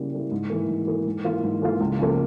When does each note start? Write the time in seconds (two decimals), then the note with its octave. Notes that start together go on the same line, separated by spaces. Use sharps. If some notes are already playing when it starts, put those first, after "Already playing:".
Already playing: C#3 G3 A#3 E4
0.12 G3 A#3 E4
0.31 G#2
0.50 E3 A#3
0.69 G#2
0.87 E3 A#3
1.06 G#2
1.24 E3 A#3 F4
1.43 G#2
1.62 E3 A#3 F4
1.80 C#2
1.99 C#3 F3 A#3